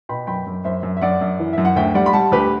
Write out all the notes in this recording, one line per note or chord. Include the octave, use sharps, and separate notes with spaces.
B2 G5 B5
F#2 G5 B5
F#2
F#2 C5 E5
F#2
E5
F#2 D5 F#5
F#2
E3
F#2 E5
F#5
D2 E5 G5
G3 D5 F#5
B5
G3 F#5 A5
D2 G4 B4